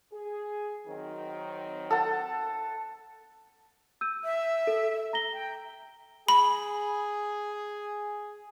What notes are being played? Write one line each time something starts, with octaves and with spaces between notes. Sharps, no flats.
G#4
D#3 F#3 C4
A4 F#5
E6 G6 D#7
E5
A4
A#5 A#6 G7
G5
G#4 B5